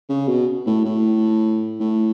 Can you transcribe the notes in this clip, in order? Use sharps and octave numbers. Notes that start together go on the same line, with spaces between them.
C#3
B2
A2
A2
A2